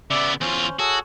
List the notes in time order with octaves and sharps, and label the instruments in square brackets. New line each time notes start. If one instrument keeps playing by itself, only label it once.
[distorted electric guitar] C#3 B3 [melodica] D5 E5
[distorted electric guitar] E2 F4 [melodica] C#4 C5
[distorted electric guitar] F#4 [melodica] G#4 A4 C#5